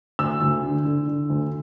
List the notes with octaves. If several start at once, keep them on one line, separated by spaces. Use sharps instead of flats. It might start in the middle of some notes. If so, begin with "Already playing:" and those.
D2 E6
D2
D3
D3
D3
D2